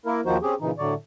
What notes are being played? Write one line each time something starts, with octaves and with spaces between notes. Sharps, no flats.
A#3 E4 A#4
D#2 D#3 F3 D#4 F#4 C5
C4 C#4 G4 G#4
A#2 C#3 E3 D#4
A2 D3 F#3 C#5 D5